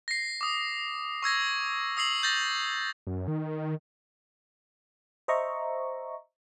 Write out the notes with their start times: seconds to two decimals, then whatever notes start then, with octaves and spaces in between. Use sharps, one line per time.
0.08 A#6 C7
0.41 D6 D#6
1.23 C#6 E6 G#6 A#6
1.97 D#6 E6 C7 F#7
2.23 G6 A6 A#6
3.07 F#2
3.28 D#3
5.28 C5 D#5 E5 A#5 C#6